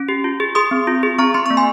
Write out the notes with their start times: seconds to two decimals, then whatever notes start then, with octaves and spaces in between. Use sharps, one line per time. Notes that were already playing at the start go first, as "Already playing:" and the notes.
Already playing: C#4
0.09 G4
0.24 F4
0.40 G#4
0.55 G#4 C6 D#6
0.71 C4
0.87 F4
1.03 G#4
1.18 C4 A#5 C#6
1.34 C4 C6
1.46 A#3 C#6
1.57 G#5 C6